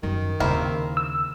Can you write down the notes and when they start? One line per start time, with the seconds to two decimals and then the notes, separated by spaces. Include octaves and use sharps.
0.03 F#2 D#3 F3
0.40 D#2 C#3 A#3 C4 E4
0.97 E6